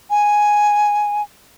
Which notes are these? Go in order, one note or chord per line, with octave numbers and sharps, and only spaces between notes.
G#5